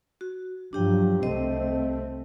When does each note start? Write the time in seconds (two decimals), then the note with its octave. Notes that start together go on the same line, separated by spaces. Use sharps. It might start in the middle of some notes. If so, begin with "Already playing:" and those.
0.21 F#4
0.73 G2 F3 F#3 D4 G4 G5
1.23 C2 A3 C4 C5 D#5